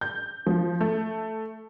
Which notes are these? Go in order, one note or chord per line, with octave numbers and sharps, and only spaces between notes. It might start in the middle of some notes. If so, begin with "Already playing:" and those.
G6
F3
A3